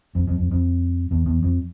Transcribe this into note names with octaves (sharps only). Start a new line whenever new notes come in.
F2
F2
F2
F2
E2
E2
F2